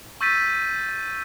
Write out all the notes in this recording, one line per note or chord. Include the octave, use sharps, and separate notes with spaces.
C#6 E6 G6 A6 B6 D#7